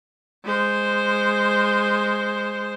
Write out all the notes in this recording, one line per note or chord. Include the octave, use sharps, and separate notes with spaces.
G#3 C5